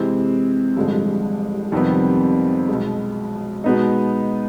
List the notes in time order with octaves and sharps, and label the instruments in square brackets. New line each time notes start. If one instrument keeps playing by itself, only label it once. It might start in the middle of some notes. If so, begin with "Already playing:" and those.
Already playing: [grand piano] C3 E3 G#3 C4
A1 G2 D3 F3 G#3
F2 C3 D#3 G3 B3
B1 B2 G#3
B2 G#3 B3 D#4